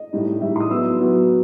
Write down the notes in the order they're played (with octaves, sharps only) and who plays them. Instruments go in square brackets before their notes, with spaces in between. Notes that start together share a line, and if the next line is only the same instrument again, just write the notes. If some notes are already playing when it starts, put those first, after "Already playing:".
Already playing: [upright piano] D#5
A2 G3 D#4
A2 G3 D#4 E5
C6
D#6
F#3 B3 E4 E6
F#3 B3 E4